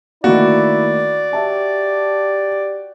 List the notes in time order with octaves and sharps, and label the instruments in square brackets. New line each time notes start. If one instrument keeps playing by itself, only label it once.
[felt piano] D#3 A3 A#3 [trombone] E4 [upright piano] F#4 [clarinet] D5
[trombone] G4 [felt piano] E5 A5